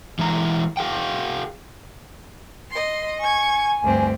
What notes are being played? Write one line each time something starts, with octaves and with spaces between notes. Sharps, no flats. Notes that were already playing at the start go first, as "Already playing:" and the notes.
E3 G#3 E4 A#5
F#4 G#4 F5 G5
D#5 C6
G#5 C#6 G#6
D2 G2 C4